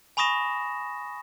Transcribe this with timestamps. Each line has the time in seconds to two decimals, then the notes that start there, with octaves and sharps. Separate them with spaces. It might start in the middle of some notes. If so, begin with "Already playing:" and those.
0.17 G#5 B5 C#6 D#6 A#6 E7